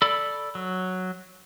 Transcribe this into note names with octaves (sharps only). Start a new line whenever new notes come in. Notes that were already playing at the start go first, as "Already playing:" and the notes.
A4 D5 B5
F#3